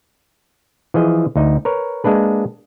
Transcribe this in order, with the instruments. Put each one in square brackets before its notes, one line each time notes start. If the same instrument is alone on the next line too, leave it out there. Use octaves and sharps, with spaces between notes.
[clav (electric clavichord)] E3 F3 G#4 D#5
D2 D#4
A#4 B4 C#5
G#3 A#3 D4 B4